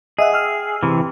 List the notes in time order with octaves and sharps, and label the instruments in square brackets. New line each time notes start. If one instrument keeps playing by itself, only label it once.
[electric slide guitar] G#4 [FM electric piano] D#5 E5 F#5
[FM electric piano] G5 E6 F6
[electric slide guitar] C3 E3